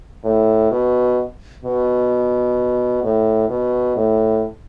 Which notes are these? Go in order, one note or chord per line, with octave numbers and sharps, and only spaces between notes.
A2
B2
B2
A2
B2
A2